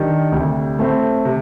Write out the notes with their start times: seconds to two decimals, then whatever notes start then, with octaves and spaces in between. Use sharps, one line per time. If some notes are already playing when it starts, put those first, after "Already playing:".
Already playing: D#3 G3 D4
0.32 D2 C3 G3
0.79 A2 A3 C4
1.25 C3